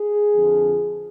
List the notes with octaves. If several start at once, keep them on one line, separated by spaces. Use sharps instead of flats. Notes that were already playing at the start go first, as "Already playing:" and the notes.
Already playing: G#4
F2 D3 F3